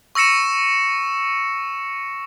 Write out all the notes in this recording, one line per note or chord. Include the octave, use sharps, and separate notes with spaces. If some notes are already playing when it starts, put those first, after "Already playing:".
C#6 E6 A#6 C#7 E7